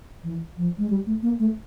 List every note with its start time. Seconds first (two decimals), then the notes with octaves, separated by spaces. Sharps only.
0.24 E3
0.57 F3
0.78 G#3
0.90 G3
1.06 A3
1.23 A#3
1.39 A3